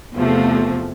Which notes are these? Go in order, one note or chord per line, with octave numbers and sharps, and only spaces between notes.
E2 C3 F3 A3